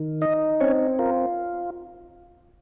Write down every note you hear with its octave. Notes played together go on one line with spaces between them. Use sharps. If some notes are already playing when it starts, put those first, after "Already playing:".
Already playing: D#3
D#4 D#5
C4 C#4 C#5
F4 A#4